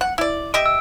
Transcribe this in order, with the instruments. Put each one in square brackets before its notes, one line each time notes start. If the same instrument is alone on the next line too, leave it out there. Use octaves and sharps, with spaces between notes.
[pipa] F#5
E4 D5
[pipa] G4 D#5 E5 [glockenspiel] D7
[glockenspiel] E6